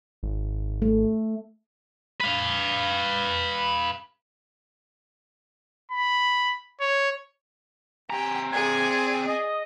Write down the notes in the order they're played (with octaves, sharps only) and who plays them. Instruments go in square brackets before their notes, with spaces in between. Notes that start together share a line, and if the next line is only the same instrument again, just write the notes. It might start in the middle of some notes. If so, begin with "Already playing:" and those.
[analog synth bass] G#1
[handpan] A3
[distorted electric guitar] B4 F5
[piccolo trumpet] B5
C#5
[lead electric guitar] C4 A#5 [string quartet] G4 G5 [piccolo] G#5
[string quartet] G#4 D5 [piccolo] G#6
[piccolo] D#5